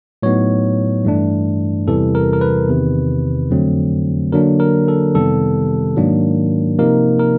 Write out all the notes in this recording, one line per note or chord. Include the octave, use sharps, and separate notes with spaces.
A2 F#3 B3 D#4 C#5
G2 E3 A3 D4
E2 C3 E3 G3 A4
A#4
A#4
B4
E2 C3 D#3
F2 D3 F#3 A3 C4
D3 F#3 A#3 D4 A#4
A#4
A4
F2 C3 D#3 G3 B3 A4
G#2 D#3 F#3 A#3 D4
C3 F3 A#3 D#4 A#4
A#4